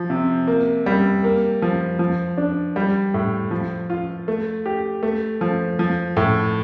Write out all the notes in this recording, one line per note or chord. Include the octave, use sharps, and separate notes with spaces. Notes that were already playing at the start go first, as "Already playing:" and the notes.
Already playing: F3
C3
A#3
G3
A#3
F3
F3
D4
G3
A2
F3
F4
A3
G4
A3
F3
F3
A2